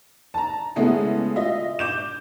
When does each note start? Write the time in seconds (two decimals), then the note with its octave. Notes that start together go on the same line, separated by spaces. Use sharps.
0.34 A5 A#5
0.76 C#3 G#3 A3 B3 E4 G#4
1.36 F4 D#5 E5
1.79 D6 G6 E7